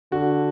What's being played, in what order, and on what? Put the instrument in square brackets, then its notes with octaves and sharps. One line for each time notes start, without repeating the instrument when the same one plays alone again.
[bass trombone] D3 [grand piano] F#4